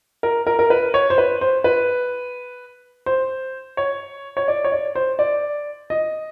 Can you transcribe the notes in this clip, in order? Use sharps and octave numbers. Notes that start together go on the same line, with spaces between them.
A#4
A#4
A#4
B4
C#5
C5
B4
C5
B4
C5
C#5
C#5
D5
C#5
D5
C5
D5
D#5